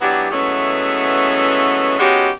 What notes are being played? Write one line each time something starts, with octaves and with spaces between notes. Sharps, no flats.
E3 F#3 B3 D4 F#4 G4
E3 F#3 G#3 A3 B3 C#4
G#3 B3 C#4 D#4 F#4 G4